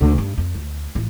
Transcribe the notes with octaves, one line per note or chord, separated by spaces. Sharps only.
D2 D3
G2 D#3
F2
D2
A1 F3